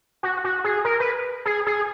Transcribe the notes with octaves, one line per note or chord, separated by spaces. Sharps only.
F#4
F#4
G#4
A#4
B4
G#4
G#4